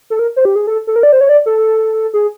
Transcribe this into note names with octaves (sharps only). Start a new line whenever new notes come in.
A4
A#4
C5
G4
G#4
A4
A4
A#4
D5
C5
C#5
D5
A4
G#4